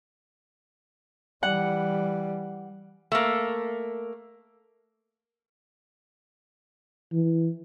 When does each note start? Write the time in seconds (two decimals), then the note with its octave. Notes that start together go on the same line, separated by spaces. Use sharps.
1.43 E3 G3 F#5
3.12 A3 A#3
7.12 E3